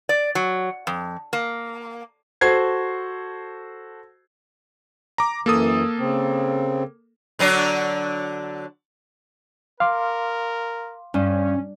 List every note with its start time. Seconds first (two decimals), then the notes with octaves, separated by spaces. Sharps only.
0.09 D5
0.35 F#3
0.87 F2
1.33 A#3
2.41 F#4 A4 C5 G#6 C7
5.18 A#5 D6
5.46 F#2 E3 A#3 A4 D#6
5.98 C#3 C4
7.39 D3 F#3 D4
9.80 A#4 F5 C6 D6
11.14 G2 C#4